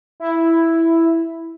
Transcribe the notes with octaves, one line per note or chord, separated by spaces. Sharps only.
E4